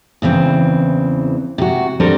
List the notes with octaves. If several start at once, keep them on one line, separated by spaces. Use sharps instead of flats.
E2 C#3 E3 C4
C3 F#4
G3 C4 D4 A4 A#4